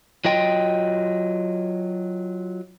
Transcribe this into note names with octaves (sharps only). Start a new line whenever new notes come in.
F#3 F4 D#5 G5